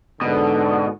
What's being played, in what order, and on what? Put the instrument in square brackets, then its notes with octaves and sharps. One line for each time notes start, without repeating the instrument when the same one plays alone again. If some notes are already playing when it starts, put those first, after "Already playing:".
[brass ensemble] G#2 D3 [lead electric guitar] B2